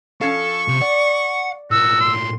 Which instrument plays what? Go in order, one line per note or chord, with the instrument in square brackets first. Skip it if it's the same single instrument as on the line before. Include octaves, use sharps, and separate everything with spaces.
[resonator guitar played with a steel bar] F3 C#4 F5 [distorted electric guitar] A4 [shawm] C#6
[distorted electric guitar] C3
[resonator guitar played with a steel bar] D5 [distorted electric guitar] F#5
[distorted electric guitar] A2 A#3 [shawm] F#4 [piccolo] E6
[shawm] C6